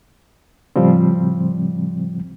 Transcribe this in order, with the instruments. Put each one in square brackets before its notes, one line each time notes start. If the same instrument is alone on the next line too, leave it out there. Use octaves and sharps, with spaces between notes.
[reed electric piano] A2 C#3 F3 G3 C4